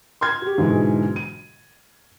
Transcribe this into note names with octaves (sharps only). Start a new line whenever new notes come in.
C6 F6 G#6
F#4 G4
G#2 B2 D3 E3 F#3 G#3
D#7